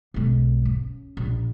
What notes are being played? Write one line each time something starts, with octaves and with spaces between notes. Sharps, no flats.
B1 G#2
C#3
A#1